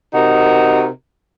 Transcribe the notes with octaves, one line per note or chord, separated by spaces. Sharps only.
C3 D#4 F#4 A#4